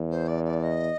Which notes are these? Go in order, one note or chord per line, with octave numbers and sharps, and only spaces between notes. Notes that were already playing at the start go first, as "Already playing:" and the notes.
Already playing: E2
C5
D5
D5
D#5